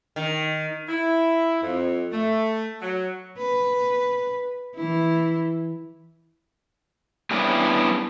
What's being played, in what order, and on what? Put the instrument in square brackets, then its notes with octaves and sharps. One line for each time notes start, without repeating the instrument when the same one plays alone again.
[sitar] D#3
[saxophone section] E4
F2
A3
F#3
[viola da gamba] B4
E3 E4
[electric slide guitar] G3 B3 C#4 D4 E4 G4